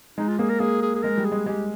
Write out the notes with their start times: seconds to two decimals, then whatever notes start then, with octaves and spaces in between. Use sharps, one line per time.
0.18 G#3 D#4
0.28 F4
0.39 A#3 G#4
0.50 A#4
0.60 A#3 G#4
0.82 G#4
0.95 G#4
1.03 G#3 A#4
1.17 G3
1.25 G#4
1.32 G#3
1.46 G#3 G4